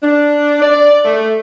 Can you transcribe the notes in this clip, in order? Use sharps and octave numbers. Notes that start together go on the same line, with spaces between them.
D4
D5
A3